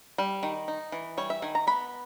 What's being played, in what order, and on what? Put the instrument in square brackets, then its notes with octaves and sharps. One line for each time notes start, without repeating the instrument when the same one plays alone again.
[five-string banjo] G3
D#3
D#4
E3
G3 C#5
E5
D#3 G#5
A#5
B3 B5